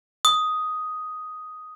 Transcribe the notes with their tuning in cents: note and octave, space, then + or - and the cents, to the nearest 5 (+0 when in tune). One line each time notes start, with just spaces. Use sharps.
D#6 +5